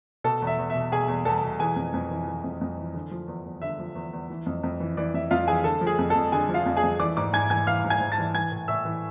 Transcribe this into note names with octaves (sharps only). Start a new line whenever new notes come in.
B2 A4 A5
E2
E5
E2
B2 E5
B2 G#4 G#5
E2
E2 A4 A5
B2
E3 G#4 G#5
F2
F2
E3
E3
F2
F2
E3
D3
F3
E2
E2
D3 E5
F3
E2
E2
E3
F2
F2
E3
E3 D5
F2 E5
F2 F4 F5
E3 G#4 G#5
D3 A4 A5
F3
G#4 G#5
F2
A4 A5
F2
D3 G#4 G#5
F3
F4 F5
F2
G#4 G#5
F2
E3 D5 D6
G#2 D5 D6
G#2 G#5 G#6
E3 G#5 G#6
E3 F5 F6
G#2
G#5 G#6
G#2
A5 A6
E3
E3 G#5 G#6
A2
A2 E5 E6
E3